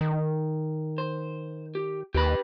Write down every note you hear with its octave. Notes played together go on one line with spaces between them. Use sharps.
D#3
C5
G4
D#2 G4 B4 B5